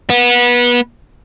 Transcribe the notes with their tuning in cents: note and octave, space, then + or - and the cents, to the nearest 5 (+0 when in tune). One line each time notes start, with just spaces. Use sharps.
B3 -25